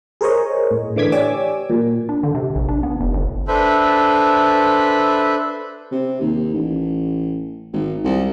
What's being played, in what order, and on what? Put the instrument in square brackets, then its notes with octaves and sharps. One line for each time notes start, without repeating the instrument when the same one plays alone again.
[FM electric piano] G#4 A#4 C5 C#5 D#5
A2
D3 E3 D6 G#6 B6
G4 C#5 D5 G#5 D6 E6
A#2
[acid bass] D4
D3
C3
A#1
D4
B3
F1
G1
[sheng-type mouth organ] D4 A4 B4 C5 E5 B5
[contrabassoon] C3
D#2
A1
G#1
C2